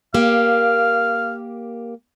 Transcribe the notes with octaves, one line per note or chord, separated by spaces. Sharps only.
A#3 G4 F5